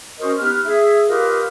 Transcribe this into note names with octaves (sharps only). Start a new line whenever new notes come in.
C#4 F#4 A#4 C5 C#5 D#5
B3 D#4 G4 B4 F6
G#4 E5
F4 G4 A#4 B4 D#5 F5